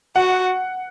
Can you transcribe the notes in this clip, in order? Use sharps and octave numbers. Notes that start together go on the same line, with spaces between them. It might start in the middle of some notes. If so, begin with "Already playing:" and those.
F#4 F#5